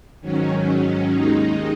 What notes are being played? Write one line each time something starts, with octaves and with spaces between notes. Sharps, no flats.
G#2 D#3 F#3 C#4
C#4
D#2 D#3 G#3 D#4